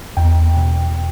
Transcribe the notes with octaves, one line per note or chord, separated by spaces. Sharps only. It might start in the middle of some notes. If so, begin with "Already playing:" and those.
E2 G5
B2